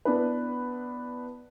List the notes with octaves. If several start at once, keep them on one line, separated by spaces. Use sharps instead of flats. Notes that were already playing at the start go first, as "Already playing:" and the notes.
B3 D4 E4 B4